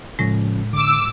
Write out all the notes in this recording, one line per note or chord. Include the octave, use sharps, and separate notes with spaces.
A2 C#3 F3 G#3 C#4 A#6
D3 D6 E6